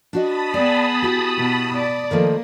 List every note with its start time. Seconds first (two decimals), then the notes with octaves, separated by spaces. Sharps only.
0.13 D4 F#4 D#5 A5 B5 D#6
0.54 B3 G#4 D5 G5
1.02 E4 F#4 G4
1.38 B2
1.75 D5
2.11 D#3 F3 A3 A#3